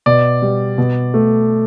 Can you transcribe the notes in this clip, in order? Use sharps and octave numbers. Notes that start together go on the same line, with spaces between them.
B2 D5
G3
B2
A3